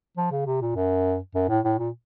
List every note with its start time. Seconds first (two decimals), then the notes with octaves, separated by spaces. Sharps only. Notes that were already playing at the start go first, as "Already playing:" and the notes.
0.17 F3
0.31 C#3
0.46 C3
0.61 A#2
0.75 F#2
1.35 F#2
1.49 A2
1.64 A2
1.79 A#2